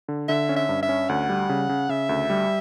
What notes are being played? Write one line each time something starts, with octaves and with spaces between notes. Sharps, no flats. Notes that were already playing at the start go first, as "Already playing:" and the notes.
D3
D3 E5
C#4
E5
G2
E5
C#4
D2 F#5
G3
C#3
C#3
C#3 E5
D2
G3